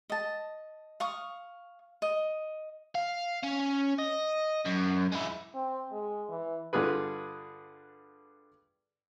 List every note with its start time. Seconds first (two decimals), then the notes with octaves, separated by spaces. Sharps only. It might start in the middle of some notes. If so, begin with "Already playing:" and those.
0.10 D#5 A5
1.00 F5 C#6 D#6
2.02 D#5
2.95 F5
3.43 C#4
3.98 D#5
4.66 F#2
5.12 G#3 E4
5.55 C4
5.92 G#3
6.29 E3
6.73 G2 D3 F4 G#4 B4